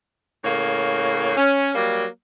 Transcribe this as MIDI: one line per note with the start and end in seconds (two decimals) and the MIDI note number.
0.44 1.35 45
0.44 1.35 49
0.44 1.35 58
0.44 1.35 73
1.36 1.73 61
1.75 2.05 54
1.75 2.05 55
1.75 2.05 58